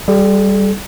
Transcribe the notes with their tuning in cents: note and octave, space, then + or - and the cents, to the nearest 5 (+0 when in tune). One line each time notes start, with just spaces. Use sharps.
G3 +0 A4 -45